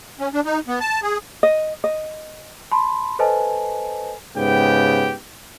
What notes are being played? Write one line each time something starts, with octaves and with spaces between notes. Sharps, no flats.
C#4
D4
D#4
B3
A5
G#4
D#5
D#5
A5 B5 C6
A4 B4 C5 D#5 G#5 A5
G#2 C#3 B3 G4 G5